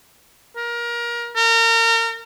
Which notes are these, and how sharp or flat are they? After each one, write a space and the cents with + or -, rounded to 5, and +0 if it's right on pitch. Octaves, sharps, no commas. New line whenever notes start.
A#4 +25
A#4 -30